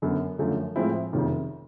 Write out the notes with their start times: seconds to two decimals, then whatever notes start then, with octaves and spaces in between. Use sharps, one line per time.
0.02 F#2 D3 F#3 B3
0.39 F#2 D3 F3 A3
0.76 A2 F3 G#3 C4 E4
1.13 F#1 F2 C3 D#3